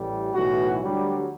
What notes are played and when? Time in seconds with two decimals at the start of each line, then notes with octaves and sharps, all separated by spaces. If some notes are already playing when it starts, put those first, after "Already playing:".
Already playing: A1 A2 G3
0.35 B1 A2 E3 F#4
0.82 D2 D3 F#3 G3